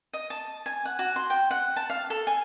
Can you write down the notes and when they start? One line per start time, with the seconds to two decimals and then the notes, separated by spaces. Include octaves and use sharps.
0.13 D#5
0.30 A5
0.66 G#5
0.85 F#5
0.99 F#4
1.16 C6
1.30 G5
1.51 F#5
1.76 A5
1.90 F5
2.10 A4
2.27 G#5